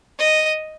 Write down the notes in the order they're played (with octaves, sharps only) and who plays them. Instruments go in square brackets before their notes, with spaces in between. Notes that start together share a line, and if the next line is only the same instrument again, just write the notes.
[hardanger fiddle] D#5